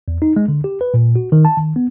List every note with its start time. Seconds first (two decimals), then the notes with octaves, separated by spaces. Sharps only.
0.08 E2
0.22 D#4
0.36 G#3
0.48 D3
0.64 G4
0.81 B4
0.94 A#2
1.16 F#4
1.32 D#3
1.45 A5
1.57 D#3
1.76 B3